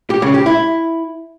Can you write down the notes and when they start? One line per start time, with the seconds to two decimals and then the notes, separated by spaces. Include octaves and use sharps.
0.10 G4
0.22 C#3
0.34 G4
0.46 E4